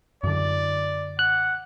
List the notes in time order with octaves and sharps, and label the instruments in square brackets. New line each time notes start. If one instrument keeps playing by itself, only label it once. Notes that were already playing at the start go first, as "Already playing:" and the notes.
[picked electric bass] F#2 D3 [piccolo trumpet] D5
[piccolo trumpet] F#5 [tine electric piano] F#6